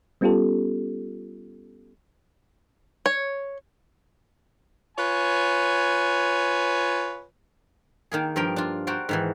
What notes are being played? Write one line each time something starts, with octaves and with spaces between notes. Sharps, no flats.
G3 B3 C#4 F4 G4 A4
C#5
F4 B4 C#5 G#5
D#3 A#3 G#4
G2 F3 A#4 G5
D4 F4
F#4 A#4 C5 D5 G5
G#2 D#3 E3